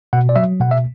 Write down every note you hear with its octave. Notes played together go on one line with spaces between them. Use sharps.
B2 F#5
D5
F#3 E5
B2 F#5
E5